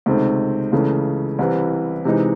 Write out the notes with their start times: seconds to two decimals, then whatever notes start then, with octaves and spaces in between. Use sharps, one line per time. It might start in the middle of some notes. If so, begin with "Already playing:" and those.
0.06 C#2 C3 D#3 A3 C4
0.72 C#2 C#3 E3 A3
1.39 C2 C3 E3
2.05 C3 E3 G#3 D#4